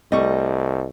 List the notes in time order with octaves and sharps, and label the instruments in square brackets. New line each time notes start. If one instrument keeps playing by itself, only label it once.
[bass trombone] C2 [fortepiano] G3 A3 C#6 [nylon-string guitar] D#5